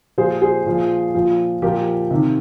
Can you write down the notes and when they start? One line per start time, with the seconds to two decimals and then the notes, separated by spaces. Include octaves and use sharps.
0.18 A#2 F3 G#4 C5
0.42 G#4 C5
0.66 A#2 F3
1.14 A#2 F3
1.62 A#2 F3 G4 A#4
2.11 C3 D#3